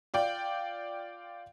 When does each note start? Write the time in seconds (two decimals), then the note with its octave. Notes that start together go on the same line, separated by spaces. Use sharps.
0.14 F4 D5 G5